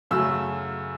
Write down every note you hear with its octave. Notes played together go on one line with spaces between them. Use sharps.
F#2 C#3 F#3 A3 E6